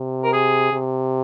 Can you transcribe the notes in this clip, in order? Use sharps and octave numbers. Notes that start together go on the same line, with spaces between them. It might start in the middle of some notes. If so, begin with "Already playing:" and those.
Already playing: C3
A#4
G#4
C3